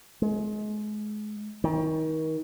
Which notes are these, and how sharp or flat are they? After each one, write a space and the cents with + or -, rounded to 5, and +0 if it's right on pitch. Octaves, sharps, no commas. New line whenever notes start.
G#3 +30
D#3 +30